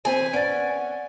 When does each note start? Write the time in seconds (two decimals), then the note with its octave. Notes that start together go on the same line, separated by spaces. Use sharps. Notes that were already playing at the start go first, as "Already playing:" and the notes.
0.05 E2 C4 B4 C5 G#5
0.33 C#4 D5 F#5 A6